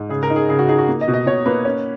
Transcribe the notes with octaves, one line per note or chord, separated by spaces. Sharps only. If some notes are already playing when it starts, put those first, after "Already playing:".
Already playing: G#2
C#3 G#4
A#4
D#4
G#4
C#3 G#4
F#4
D#4 G#4
F#4
A#3
D#5
B2
D#5
B2 C#5
A#3 B4
C#4